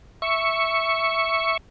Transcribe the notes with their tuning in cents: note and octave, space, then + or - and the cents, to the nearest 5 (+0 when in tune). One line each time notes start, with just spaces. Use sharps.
E5 +0 C#6 +0